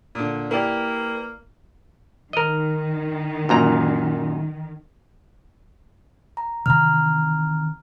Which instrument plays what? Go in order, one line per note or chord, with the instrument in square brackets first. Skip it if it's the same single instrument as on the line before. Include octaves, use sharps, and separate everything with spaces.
[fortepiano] A#2 D3
[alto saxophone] A#3 [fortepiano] E4 G4 D5 [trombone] B4
[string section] D#3 [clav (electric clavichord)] A#4 D#5
[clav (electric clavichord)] F#2 A#2 A#5
[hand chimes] A#5
[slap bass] C3 D#3 E3 [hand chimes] A#5 F6